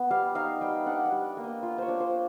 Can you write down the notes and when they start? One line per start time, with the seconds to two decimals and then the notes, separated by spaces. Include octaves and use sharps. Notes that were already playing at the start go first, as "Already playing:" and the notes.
Already playing: B3
0.11 G3 F5
0.35 D#4 F5
0.61 G3 G5
0.86 D4 F#5
1.06 F5
1.12 G3
1.37 A#3
1.44 D#5
1.63 F4
1.78 C5 C#5
1.88 D4
2.00 C5